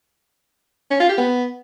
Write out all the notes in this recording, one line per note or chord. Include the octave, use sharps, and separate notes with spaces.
C#4
F4
G4
B3